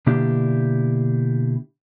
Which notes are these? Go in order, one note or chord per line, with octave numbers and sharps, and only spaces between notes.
B2 D3 A#3 D4 E4 G4